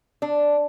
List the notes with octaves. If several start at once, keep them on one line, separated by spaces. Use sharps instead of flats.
D4